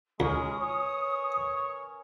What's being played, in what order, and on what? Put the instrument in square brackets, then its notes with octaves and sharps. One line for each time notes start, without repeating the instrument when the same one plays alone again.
[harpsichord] C#2 [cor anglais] G#3 [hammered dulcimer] C#4 A#4 B4 [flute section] D#6
[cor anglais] C#5